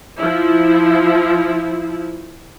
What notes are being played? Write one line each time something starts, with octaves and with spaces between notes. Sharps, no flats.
F3 E4